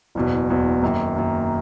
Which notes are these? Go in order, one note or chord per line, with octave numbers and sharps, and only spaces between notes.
F#1 E2 B2
F#1 E2 B2
F#2 D#3 A#3
F#2 D#3 A#3